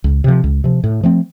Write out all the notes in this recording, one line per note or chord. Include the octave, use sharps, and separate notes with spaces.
C#2
C3 F3
C#2
C3 F3
A2
F3 A3 C4